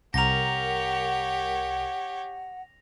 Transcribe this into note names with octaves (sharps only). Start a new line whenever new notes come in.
C2 G4 A#4 C#5 F#5 A#6 F7